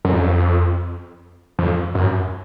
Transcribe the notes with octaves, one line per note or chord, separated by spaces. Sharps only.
F#2
F2
F2
F#2